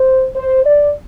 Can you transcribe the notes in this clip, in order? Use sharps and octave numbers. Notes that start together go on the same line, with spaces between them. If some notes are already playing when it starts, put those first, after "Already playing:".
Already playing: C5
C5
D5